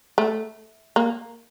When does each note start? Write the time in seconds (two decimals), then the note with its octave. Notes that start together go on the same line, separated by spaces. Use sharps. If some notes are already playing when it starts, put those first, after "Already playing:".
0.18 A3
0.96 A#3